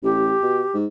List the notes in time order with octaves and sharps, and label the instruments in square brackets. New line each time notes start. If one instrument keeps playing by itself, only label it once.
[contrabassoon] A1 [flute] G4
[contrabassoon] B2
G#2